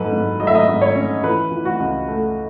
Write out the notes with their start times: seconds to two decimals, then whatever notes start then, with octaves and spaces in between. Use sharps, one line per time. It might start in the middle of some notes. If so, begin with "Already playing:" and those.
Already playing: G#2 F#3 A4 B4
0.12 G#2
0.40 F#3 D#5
0.47 E5
0.55 D#5
0.68 G#2
0.82 C#5
0.96 C#4
1.24 E3 B4
1.51 E3
1.65 F#4
1.80 C#2
2.08 A3